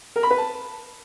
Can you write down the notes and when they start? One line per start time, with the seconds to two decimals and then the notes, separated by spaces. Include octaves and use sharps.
0.16 A#4
0.23 B5
0.31 B4
0.38 A5